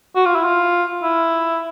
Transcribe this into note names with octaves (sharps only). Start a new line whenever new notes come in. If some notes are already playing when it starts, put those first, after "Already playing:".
F#4
F4
E4
F4
E4